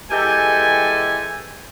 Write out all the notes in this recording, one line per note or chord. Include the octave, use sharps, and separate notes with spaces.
E3 G#3 G4 A4 G#5